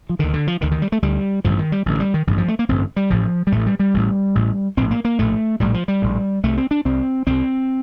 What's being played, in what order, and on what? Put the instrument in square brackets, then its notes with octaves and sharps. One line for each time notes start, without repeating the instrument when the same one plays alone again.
[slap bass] F3
D2 D3 D#3
D3
F3
D2 D3 D#3
D#3
G3
A3
D2 D3 G3
A1 G2 D3 F3
D#3
G3
A1 G2 D3
G3
D#3
A1 G2 D3 F3
F3
A3
A#3
A1 G2 D3 C4
G3
A1 A2 F3
G3
A1 A2 A3
G3
G3
A1 A2
A1 A2
A#1 A2 C4
A#3
A#3
A#1 A2 A3
A#1 A2 G3
F3
G3
A#1 A2
C2 C3 A3
C4
D4
C2 C3 C4
C2 C3 C4